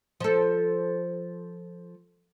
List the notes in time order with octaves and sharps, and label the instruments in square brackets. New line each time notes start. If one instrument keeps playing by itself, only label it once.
[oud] F3 A4